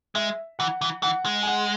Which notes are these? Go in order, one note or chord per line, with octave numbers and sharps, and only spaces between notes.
G#3 E5
E3 F#5
E3
E3 F#5
G#3
G#5
F#5